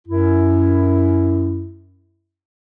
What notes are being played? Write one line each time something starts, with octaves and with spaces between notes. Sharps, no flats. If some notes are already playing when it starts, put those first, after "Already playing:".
F#2 E4